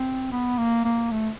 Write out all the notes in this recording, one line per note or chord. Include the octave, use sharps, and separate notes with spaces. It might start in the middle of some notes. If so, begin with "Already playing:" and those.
Already playing: C4
B3
A#3
A#3
A3